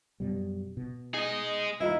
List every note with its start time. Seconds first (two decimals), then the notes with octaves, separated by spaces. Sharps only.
0.20 F#2 B2 G3
0.77 B2
1.14 D#4 G#4 D#5
1.80 D#2 E4 F4 D#5